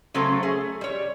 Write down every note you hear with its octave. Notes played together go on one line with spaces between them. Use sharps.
C#3 F#3 A3 C#4 A4 C5
A3 G#4
G3 C#5